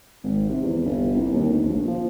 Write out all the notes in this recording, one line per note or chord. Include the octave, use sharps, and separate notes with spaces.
G#1
C3
E2
G1
C2
D#2
D2
A#1
F3